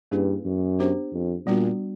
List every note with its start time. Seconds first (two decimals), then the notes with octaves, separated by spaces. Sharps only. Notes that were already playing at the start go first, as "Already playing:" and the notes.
0.11 G2 A#3 C#4 E4 G#4 B4
0.45 F#2
0.79 B3 D4 G4 C5
1.12 F2
1.46 A#2 G3 B3 D4 F#4